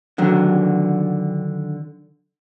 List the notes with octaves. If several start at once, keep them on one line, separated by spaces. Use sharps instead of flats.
D3 D#3 F#3